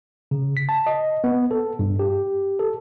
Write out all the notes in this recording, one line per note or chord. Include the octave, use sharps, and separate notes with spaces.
C#3
B6
A5
D#5
B3
A4
G2
G4
A4